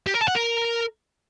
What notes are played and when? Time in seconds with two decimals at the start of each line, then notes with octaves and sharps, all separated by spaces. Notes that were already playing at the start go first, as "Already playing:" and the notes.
0.07 G4
0.14 A#4
0.21 A5
0.28 F#5
0.35 A#4